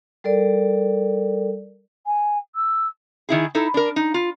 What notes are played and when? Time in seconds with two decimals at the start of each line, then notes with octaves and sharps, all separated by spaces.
0.24 G3 A4 A#4 D5
2.06 G#5
2.55 E6
3.29 D#3 E4 G#4
3.55 D#4 E4 A4
3.74 D4 A#4
3.96 D#4
4.14 F4